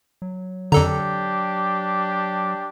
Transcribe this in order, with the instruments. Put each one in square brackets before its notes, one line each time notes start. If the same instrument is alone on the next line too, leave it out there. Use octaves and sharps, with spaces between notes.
[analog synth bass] F#3
[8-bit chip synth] F2 A4 A#5 [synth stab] D3 [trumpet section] D4 G4